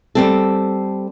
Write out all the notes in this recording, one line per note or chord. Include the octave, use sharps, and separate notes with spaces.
G3 C4 A4